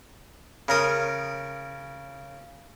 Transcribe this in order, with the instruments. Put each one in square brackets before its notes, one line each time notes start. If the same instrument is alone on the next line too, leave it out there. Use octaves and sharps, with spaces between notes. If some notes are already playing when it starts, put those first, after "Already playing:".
[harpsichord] C#3 A#4 D#6